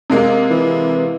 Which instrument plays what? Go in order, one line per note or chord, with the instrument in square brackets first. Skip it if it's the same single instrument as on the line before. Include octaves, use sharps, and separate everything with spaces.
[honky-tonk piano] C3 G#3 A#3
[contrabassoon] E3